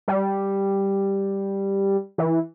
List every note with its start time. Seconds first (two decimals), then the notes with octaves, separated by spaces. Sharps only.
0.08 G3
2.18 E3